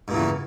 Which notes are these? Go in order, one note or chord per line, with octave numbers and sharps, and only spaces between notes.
E2 G2 A#2 C#3